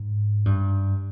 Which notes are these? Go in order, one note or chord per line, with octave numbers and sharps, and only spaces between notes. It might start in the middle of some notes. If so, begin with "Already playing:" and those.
Already playing: G#2
G2